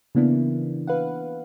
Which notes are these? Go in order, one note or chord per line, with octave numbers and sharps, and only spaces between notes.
C#3 E3 A#3 B3 D4 E4
B4 F5 F#5